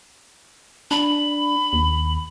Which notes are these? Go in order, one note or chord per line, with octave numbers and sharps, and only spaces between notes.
D4 B5
D#2